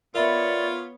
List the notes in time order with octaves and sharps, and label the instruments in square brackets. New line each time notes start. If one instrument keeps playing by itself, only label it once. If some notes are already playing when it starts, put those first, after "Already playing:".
[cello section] B3 C#5 [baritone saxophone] F4 [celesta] A#4 E5 B5 [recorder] D5